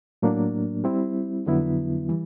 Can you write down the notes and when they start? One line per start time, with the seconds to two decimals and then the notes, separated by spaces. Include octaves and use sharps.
0.22 A2 F#3 A#3 D4
0.84 G3 C4 E4
1.46 F2 D3 F#3 B3 E4
2.09 E3 G3